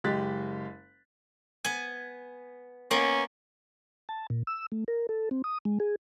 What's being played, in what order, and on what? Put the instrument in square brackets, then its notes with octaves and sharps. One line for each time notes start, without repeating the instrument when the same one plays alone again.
[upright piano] F#1 G#3 G4 F#6 A6 B6
[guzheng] B3 G#5
[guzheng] A#3 B3 [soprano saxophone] C#4
[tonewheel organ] A5
A#2
E6
A3
A#4
A4
C4
D#6
G#3
G#4